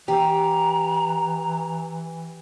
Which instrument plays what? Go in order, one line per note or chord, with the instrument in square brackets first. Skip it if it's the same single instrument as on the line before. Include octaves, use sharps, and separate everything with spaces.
[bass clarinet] E3 [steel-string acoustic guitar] G4 [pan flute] A#5